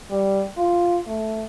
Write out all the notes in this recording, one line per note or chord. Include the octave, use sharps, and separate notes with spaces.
G3
F4
A3